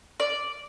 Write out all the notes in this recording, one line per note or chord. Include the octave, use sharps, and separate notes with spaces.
D5